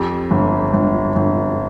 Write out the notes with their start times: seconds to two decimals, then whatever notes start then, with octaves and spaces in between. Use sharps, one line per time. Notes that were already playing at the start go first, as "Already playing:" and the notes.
Already playing: F2 G4
0.31 G1
0.74 G1
1.16 G1